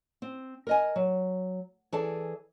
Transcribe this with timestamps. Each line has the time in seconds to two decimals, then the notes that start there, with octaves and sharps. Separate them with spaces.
0.22 C4
0.67 A#4 D#5 G#5
0.96 F#3
1.92 E3 G#4 A4 D5 A5